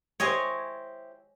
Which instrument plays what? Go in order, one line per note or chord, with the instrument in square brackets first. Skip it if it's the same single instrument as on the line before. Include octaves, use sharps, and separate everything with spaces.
[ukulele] E4 G4 C5 [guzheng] C#5 D#5 G#5